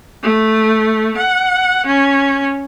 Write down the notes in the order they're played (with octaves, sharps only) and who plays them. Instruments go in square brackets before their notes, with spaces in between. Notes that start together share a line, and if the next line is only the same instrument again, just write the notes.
[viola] A3
F#5
C#4